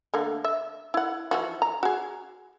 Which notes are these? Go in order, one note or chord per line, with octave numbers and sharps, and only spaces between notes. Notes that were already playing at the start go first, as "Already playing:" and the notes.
D3 A3 A#3
E5
E4 F#5
E3 F3 F#4
A#5
F#4 G#4